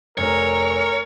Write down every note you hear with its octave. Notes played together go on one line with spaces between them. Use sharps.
F1 A#4 C#5